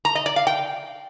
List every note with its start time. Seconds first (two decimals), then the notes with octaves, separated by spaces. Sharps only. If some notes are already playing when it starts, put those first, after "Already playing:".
0.05 A#5
0.15 D#5
0.26 D5
0.36 F5
0.47 G5